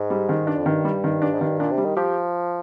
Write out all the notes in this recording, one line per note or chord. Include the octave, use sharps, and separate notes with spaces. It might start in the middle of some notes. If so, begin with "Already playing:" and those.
Already playing: G#2
G3
D#3
G2 D4
F2
G2 D#3
G3
D#3
G2 D4
G#2
G2 D#3
A#2 D4
C3
G3
D#3
F3 G4